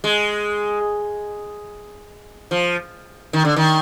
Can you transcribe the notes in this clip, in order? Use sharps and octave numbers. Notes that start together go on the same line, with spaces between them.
G#3
F3
D#3
D3
D#3